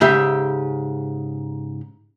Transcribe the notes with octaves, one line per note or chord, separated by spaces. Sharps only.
G#2 C#3 G4 E5